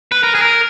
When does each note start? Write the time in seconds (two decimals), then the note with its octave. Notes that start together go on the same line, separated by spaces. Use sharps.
0.12 B4
0.23 A#4
0.35 G#4
0.42 A#4